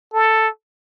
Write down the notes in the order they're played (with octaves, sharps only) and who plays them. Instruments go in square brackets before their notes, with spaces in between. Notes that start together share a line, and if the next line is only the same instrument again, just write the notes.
[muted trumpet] A4